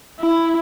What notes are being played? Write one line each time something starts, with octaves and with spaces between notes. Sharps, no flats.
E4